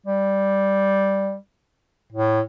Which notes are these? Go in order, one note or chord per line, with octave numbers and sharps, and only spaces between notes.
G3
A2